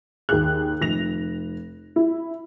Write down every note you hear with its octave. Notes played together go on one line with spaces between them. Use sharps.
D#2 G#4 F#6
F1 A#6 F7
E4